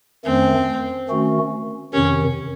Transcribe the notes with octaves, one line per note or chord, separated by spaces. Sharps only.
F2 D#3 A3 C4 C#4
D#3 A3 C#4 F#4
F2 C3 D#3 C#4